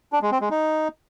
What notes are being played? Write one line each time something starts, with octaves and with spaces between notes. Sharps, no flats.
D4
G#3
C4
G#3
D#4